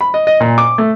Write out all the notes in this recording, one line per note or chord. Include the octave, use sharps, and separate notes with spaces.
B5
D#5
D#5
A#2
D6
A3